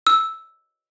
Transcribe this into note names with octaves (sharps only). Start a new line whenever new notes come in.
E6